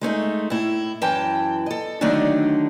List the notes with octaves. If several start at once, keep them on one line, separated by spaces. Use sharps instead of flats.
G#3 A3 C#4 D#4
A2 E4
F#2 E3 G5 A5
A4 D#5
D3 D#3 F#3 A3 D4 D#4